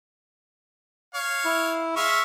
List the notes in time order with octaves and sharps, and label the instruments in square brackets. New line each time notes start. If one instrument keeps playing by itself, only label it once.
[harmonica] C#5 F5
[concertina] E4
[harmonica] G#3 E5 F5 [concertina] C#6